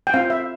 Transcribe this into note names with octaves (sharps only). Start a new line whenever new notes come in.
G5
C4 F4 F5
E5